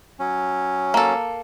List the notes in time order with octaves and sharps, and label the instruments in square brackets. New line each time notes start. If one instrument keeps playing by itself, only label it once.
[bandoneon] F#3 C#4
[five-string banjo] A#3 A4